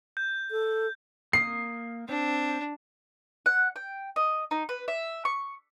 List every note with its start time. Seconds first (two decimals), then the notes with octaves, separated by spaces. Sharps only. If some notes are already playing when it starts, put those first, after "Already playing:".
0.17 G6
0.51 A4
1.33 A#3 D#6 C7
2.09 C4 D4
3.46 F#5
3.76 G5
4.16 D#5
4.51 D#4
4.69 B4
4.88 E5
5.25 C#6